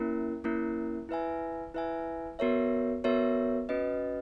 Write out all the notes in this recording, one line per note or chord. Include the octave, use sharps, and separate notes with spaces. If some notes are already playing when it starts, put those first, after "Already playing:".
Already playing: A#3 C#4 E4 A#4
A#3 C#4 E4 A#4
E4 B4 E5 G#5
E4 B4 E5 G#5
B3 F#4 A#4 C#5 E5
B3 F#4 A#4 C#5 E5
C#4 F#4 B4 D#5